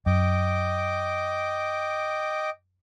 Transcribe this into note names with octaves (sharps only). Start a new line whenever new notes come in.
F#2 D#5 G5 D6